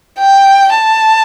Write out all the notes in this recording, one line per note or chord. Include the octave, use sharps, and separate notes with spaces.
G5
A5